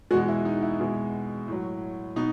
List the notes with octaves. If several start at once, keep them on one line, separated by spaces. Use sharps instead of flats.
E2 B2 G#3 F#4
E4
D#4
E4
E2 B2 G#3
A2 F#3
B2 D#4